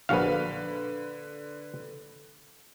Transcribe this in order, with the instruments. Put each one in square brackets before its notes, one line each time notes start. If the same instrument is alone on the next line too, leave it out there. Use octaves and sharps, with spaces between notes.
[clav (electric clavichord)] A#1 F#4 F5 [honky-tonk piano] D3 B4